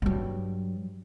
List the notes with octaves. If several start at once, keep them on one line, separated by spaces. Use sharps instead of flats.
G2 F#3